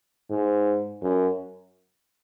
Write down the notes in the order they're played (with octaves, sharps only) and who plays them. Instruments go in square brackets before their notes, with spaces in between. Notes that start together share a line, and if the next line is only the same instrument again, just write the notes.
[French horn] G#2
F#2